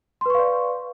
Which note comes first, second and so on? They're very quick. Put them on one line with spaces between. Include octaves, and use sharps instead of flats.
C6 B4 C#6 F5 D5